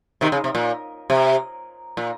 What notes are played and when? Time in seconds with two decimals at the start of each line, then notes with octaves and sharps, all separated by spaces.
0.21 C3 D#3
0.32 C#3
0.44 C3
0.55 A#2
1.10 C3
1.97 A#2